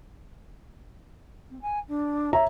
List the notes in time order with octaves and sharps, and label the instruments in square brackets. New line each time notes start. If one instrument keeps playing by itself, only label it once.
[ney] C4
G#5
D4
[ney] C#5 [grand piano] E5 A#5